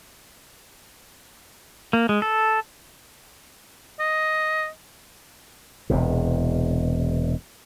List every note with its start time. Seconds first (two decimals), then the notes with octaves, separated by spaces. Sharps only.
1.93 A#3
2.09 G#3
2.22 A4
4.00 D#5
5.90 E1 E2 C3